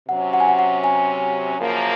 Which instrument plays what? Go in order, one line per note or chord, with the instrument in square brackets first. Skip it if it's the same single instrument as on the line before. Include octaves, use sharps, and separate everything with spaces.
[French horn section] C3 F#3 C#4 [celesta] F#5
[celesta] F#5
G#5
F#5
F#5
G#5
[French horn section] F#2 C#3 F3 A#3